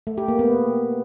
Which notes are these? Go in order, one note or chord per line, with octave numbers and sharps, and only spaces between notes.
A3
G4
A#3
B3